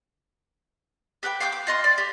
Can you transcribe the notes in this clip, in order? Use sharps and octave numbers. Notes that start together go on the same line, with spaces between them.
G4 B4 F#5 G5
F5 G5 D6 G6
D6
F4 D#5 C6
D5
G4